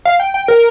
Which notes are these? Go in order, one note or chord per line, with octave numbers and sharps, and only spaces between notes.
F5
G5
G5
A#4